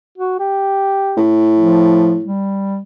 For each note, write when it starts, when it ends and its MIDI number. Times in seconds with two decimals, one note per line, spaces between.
0.18 0.34 66
0.39 1.19 67
1.17 2.29 45
1.58 2.15 53
2.24 2.80 55